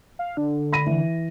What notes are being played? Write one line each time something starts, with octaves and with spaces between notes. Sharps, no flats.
F5
D3
B5 A#6 D#7
E3